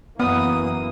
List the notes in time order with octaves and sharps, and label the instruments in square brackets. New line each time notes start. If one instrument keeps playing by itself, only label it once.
[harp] F#2 F#3 E5 [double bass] E3 A#3 [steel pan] B3 [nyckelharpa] D#6